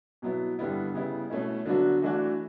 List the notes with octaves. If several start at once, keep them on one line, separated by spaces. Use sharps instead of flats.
B2 F#3 B3 E4
G2 D3 G3 B3 E4
C#3 G3 B3 E4
B2 A3 C#4 E4
D3 F#3 B3 D4 F#4
E3 A3 D4 F#4